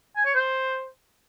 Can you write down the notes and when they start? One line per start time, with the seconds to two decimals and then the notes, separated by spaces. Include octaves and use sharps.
0.16 G#5
0.25 C#5
0.34 C5